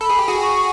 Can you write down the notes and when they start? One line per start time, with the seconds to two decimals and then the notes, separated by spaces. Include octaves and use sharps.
0.01 A4 B5
0.10 G#4
0.19 G4
0.28 F#4 G#4
0.42 C#6